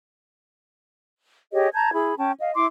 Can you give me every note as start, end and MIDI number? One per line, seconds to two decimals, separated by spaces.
1.53 1.68 67
1.53 1.68 68
1.53 1.68 73
1.53 1.68 75
1.74 1.92 81
1.74 1.92 82
1.74 1.92 91
1.74 1.92 92
1.93 2.15 64
1.93 2.15 68
1.93 2.15 83
2.18 2.31 61
2.18 2.31 79
2.18 2.31 81
2.39 2.52 75
2.39 2.52 77
2.54 2.66 64
2.54 2.66 84
2.54 2.66 86